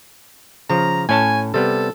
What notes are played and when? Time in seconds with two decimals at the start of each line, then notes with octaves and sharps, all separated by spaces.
0.70 C#3 F3 A#5
1.09 A2 C#4 G#5 A5
1.54 C3 G3 B3 A4